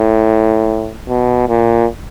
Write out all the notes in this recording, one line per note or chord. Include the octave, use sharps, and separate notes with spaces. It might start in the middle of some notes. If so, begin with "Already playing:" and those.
Already playing: A2
B2
A#2